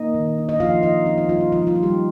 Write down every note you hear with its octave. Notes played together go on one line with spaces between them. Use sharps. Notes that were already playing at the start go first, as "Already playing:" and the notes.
Already playing: A#3 D#4 D#5
D#3
D4
D#5
F3 F4 F5
D#4 D#5
C4 F4
D#4
G3 F4
D#4
F3 F4
F4
D#4
G3 G4